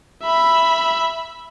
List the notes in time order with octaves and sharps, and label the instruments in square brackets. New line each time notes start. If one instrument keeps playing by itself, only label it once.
[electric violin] E5 B5